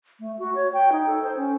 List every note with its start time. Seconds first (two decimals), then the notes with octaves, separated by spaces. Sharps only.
0.20 A3
0.39 F#4
0.55 C#5
0.73 G5
0.92 D#4
1.06 A4
1.23 C5
1.37 C#4